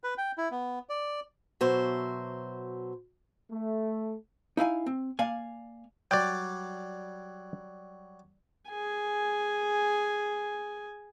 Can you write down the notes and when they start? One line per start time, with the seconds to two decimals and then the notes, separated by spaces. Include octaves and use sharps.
0.04 B4
0.18 G5
0.38 E4
0.51 B3
0.89 D5
1.61 B2 F#3 C5 E5
3.52 A3
4.57 D#4 E4 F5 G#5
4.86 C4
5.19 A#3 D5 F5 G#5
6.11 F#3 G3 D5 G5
8.69 G#4 G#5